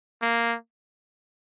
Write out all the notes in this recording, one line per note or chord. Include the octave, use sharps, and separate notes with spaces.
A#3